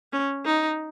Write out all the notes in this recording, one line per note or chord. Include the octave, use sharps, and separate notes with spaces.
C#4
D#4